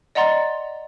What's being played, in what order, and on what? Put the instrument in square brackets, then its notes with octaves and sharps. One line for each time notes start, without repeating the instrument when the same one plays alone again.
[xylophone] D5 D#5 F#5 A#5 C6 A6